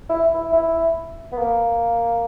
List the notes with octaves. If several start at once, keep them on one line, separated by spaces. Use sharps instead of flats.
E4
E4
E4
B3
A#3